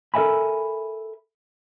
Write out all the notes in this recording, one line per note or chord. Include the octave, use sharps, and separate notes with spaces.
A4 A#4 D#5 E5 G#5 B5